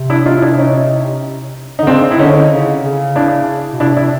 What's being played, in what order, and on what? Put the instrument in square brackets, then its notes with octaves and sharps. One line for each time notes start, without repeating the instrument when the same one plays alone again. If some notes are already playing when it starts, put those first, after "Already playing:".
Already playing: [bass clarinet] C3
[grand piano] D4 E4
D#4 F4
D4 E4
C#4 D#4
D#4
[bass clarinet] D3
[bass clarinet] C#3 [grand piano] C4 D4
[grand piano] E4
[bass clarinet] D3 [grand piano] C#4 D#4
[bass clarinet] C#3
C#3
[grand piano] D4 E4
[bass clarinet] B2
[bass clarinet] C3 [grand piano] D4 E4
[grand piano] D4 E4